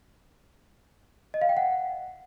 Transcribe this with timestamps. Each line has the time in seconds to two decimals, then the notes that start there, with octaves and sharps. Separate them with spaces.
1.34 D#5
1.42 F5
1.49 G5
1.57 F#5